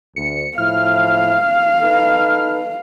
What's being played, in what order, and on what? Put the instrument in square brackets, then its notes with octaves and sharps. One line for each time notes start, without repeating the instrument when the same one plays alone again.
[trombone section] D2 [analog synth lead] C#7
[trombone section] A2 F3 E4 [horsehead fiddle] F5 [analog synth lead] F6
[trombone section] D#4 A4 B4